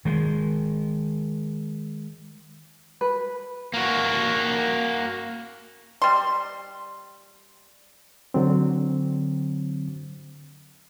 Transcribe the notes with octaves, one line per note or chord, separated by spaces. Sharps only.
D#3 G#3
B4
A#3 F#4
G3 C6
D3 F#3 C4